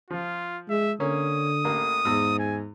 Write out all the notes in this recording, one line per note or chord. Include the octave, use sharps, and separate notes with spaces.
F3 F4
G#3 E5
D3 A#3 C#4 D#6
A1 A#3
E2 G#2 E6
G#5